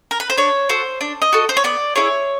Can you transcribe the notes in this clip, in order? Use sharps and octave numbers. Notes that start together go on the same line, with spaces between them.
A#4
B4
C5
D4 C#5
F#4 A4 C5
D4
D#5
F#4 A4
C5
C#5
B3 D5
E4 G#4 C#5